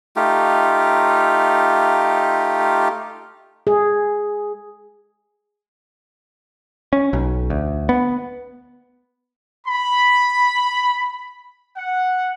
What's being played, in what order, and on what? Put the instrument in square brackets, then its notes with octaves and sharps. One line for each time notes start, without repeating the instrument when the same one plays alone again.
[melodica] A3 D#4 F4 G4
[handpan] G#4
[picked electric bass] C#4
B1
D2
B3
[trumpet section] B5
F#5